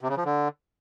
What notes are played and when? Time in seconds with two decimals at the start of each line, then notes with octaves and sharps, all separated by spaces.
0.01 C3
0.09 C#3
0.17 F3
0.25 D3